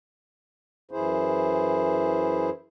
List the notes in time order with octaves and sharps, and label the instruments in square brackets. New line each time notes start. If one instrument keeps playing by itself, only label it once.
[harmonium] F#2 E3 E4 G#4 C5